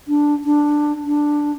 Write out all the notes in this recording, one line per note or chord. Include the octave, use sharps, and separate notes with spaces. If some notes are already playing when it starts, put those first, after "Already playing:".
D4
D4
D4